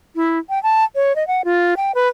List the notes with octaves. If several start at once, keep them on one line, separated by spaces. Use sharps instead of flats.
E4
G5
A5
C#5
D#5
F#5
F4
G5
B4